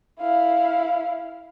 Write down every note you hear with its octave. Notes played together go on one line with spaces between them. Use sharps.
E4 F5